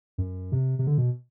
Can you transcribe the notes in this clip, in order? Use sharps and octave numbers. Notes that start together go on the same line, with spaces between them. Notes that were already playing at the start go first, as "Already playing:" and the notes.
F#2
C3
C3
D3
B2